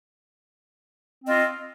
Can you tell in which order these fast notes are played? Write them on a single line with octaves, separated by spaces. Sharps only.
C4 D#5 F4